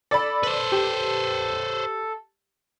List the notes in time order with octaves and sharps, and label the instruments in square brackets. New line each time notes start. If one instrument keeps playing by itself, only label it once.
[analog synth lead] A4 [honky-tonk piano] D5 B5
[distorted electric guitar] B4 C5
[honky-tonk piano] G4